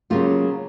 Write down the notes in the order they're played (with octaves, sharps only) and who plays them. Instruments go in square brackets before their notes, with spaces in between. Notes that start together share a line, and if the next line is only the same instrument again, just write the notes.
[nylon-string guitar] C#3 F#3 A#3 F4 G4